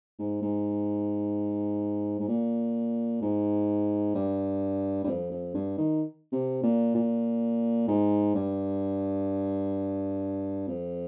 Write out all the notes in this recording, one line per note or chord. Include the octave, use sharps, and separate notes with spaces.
G#2
G#2
G#2
A#2
G#2
G2
G2
F2
F2
G2
D#3
C3
A#2
A#2
G#2
G2
F2